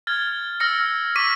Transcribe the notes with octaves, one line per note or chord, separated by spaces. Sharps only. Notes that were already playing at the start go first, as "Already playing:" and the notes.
F6 G#6 A6 G7
E6 F6 A#6 C#7
C#6 D6 E6 F6 B6 D#7